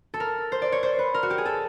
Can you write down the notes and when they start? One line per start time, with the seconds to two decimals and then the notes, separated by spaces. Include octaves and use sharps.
0.14 A4
0.20 A#4
0.52 C5
0.62 D5
0.72 C#5
0.83 C5
0.99 B4
1.14 A#4
1.23 F#4
1.30 G4
1.38 G#4
1.45 A4